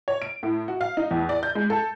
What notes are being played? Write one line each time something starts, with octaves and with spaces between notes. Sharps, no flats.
C#5
D7
A2
F#4
F5
D#4
E2
D5
G6
G#3
A4